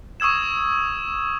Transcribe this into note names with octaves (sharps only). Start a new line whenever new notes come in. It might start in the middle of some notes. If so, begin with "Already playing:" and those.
C#6 D#6 E6 G#6 E7